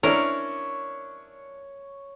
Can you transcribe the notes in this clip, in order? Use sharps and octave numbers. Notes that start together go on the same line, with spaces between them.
C#4 D4 E4 A#4 C#5